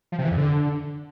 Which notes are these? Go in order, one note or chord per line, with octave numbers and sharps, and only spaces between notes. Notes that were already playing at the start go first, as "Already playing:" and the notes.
F3
C3
E3
F2
D3